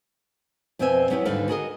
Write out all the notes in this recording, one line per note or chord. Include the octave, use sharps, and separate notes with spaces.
F2 B2 C4 C5 E5 G#5
F#3 B3 C#4 E4 G4
D#2 G#2 D3 G3 B4 F5
F#4 G#4 A#4 D#5